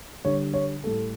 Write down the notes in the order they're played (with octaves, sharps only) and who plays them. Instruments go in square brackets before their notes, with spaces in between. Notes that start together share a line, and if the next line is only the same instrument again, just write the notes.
[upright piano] D3 G3 C#5
C#5
A2 G3 A4